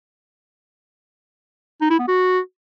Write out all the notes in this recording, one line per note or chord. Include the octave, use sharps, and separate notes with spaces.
D#4
E4
B3
F#4